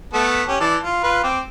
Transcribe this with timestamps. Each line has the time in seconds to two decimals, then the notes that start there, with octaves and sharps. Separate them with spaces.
0.13 A3 B3 A5
0.48 C#4 G4
0.60 E3 D5 A5
0.83 F4
1.03 F4 B4
1.24 C4 D6